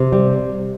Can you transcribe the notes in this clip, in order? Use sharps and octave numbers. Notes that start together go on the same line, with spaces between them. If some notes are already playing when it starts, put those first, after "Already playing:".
Already playing: C3
G3